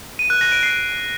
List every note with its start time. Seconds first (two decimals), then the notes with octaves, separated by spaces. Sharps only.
0.19 D#7
0.30 F#6
0.41 A#6
0.52 D7
0.63 C7